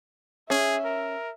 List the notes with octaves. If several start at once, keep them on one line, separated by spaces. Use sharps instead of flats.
C#4 G#4 E5
A#4